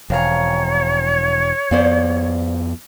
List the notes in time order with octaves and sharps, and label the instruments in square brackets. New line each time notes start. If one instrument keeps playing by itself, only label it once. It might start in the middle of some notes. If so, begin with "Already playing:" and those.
[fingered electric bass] E1 [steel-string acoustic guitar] F2 F5 A#5 [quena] C#5
[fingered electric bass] F2 B3 [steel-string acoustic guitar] C5 D5 F5